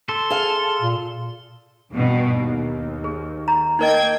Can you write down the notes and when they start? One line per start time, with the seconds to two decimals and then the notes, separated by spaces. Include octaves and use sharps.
0.09 A4 C6
0.30 G#4 F5
0.81 A#2
1.91 E2 G2 B2
2.31 D#2
3.04 G#4
3.48 A#5
3.79 A#3 D#4 A#4 D#5 G5 G#6